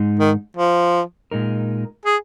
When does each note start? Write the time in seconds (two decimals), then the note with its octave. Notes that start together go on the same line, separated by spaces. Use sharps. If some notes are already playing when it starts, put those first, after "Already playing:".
Already playing: G#2 G#3 D#4
0.20 D#3
0.57 F3
1.31 A#2 G#3 D#4 A#4
2.05 G#4